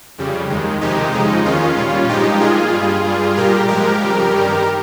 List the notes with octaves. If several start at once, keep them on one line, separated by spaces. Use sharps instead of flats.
F2 C#3 G3
D#2 D#3 G#3
F2 C3 D#3 G#3 D#4 G4
F2 C#3 F3 G#3 D#4
D#2 D#3 G#3 C#4 F4
A#2 G3
G2 F3 G#3 D#4 G4
A#2 G#3 F4 G#4
G2 G3
G2 G3
A#2 G3 G4 A#4
G#2 F3 G#3 G4 A#4
F2 C#3 G3
G2 D#3 G3